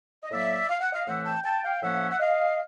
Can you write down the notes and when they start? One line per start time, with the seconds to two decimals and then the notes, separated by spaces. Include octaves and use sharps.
0.23 D#5
0.31 A2 F#3 A#3 D5 E5
0.70 F5
0.81 F#5
0.93 D#5 F5
1.07 A2 E3 A3 C4 E5 F#5
1.25 G5 A5
1.44 G5 A5
1.63 F5 G5
1.82 A2 F3 A#3 C#4 E5 F#5
2.11 F#5
2.20 D#5 F5